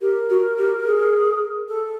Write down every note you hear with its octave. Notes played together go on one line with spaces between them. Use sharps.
G4 A#4
F#4
G4
G#4
A4